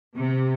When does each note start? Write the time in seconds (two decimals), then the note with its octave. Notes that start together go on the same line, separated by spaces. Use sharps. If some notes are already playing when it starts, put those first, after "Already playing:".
0.16 C3